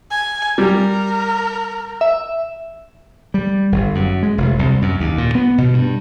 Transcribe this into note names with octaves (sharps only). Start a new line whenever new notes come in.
G#5
G3 A#4
E5
G3
G1
F#2
G#3
F1
C2
F#2
D#2
A#2
B3
B2
G2